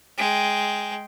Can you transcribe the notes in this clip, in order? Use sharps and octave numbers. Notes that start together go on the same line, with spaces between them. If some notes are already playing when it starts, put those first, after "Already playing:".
G#3 G5